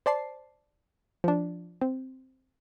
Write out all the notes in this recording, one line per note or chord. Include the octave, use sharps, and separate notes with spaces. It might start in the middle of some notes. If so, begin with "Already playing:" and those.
C5 D5 A5 C7
F3 D4
C4